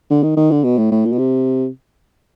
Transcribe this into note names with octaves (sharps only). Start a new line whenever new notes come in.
D3
D#3
D#3
D3
B2
A2
A2
A#2
B2
C3